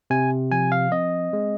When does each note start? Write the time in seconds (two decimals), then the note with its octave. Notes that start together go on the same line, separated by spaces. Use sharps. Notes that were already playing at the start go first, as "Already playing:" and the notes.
0.10 C3 G#5
0.51 F3 G#5
0.72 F5
0.92 C4 D#5
1.33 G#3